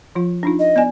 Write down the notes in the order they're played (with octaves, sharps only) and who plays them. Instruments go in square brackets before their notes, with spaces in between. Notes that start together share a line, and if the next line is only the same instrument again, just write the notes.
[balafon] F3 F4
D4 D#4 F4
[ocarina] D#5
[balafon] B3 D5 G#5